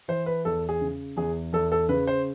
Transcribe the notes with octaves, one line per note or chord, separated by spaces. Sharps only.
E3 C5
B4
E2 A4
G#4
C#3
E2 G#4
E2 A4
A4
C#3 B4
C5